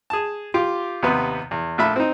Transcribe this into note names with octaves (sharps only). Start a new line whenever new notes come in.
G#4 A5
F4 G4 D6
D#2 C3 B3
E2
A#1 A3 E5 B5
C4 D#4